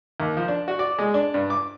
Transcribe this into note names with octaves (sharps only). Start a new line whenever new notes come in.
D#2
F3
D4
F#4
D5
G#3
D4
G2
D6